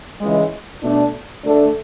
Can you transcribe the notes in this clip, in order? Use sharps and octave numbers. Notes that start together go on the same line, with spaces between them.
C#2 C#3 E3 G#3
B2 A3 D4
D2 D3 A3 D4 A4